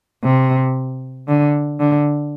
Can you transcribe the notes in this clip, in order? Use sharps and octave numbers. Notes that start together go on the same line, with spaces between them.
C3
D3
D3